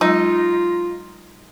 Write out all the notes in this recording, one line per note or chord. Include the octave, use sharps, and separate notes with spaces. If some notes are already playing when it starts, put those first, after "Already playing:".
F#3 G#3 D#4 F4